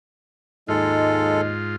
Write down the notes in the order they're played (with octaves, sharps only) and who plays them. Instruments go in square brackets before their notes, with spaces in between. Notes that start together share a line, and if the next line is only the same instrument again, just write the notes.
[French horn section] D#2 D#4 D#5 [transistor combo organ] G#2 F4 [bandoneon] G#3 A4